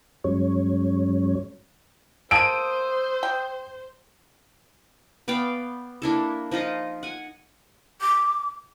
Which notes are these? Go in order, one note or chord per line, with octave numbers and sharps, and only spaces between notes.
G2 F#3 G#3 C#4 C#5
A#3 G#4 A4 C5 D#6 E6 D7 D#7
G5
B3 D5 F5 G5
A#3 D4 E4 A4
F3 D#4 F4 D#5
F#5 G#5
D6